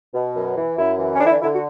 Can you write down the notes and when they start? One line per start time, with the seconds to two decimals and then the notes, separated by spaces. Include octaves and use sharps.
0.13 B2
0.36 F#2
0.56 E3
0.78 F#2 E4
0.99 E3
1.15 C#4
1.20 D3 D4
1.26 E4
1.31 D4
1.42 D3 E4
1.54 F#4